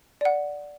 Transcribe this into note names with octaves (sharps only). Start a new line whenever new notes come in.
D5 F#5